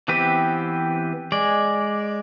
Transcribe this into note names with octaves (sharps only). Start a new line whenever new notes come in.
E3 B3 C4 G4 B4
G#3 D5